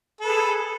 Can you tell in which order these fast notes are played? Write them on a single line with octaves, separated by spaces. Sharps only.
A4 B4 G#4